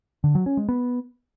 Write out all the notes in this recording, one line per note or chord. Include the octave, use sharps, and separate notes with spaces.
D3
F#3
C#4
G#3
B3